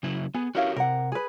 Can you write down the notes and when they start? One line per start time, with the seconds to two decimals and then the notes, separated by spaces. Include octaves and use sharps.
0.03 C#3 F#3 E4
0.34 B3 G#4
0.55 C#4 E4 F#4 G4 A#4 F5
0.76 C3 A#4 F#5
1.12 G#4 B4